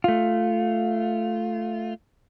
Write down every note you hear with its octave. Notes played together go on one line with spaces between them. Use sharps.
A3 F4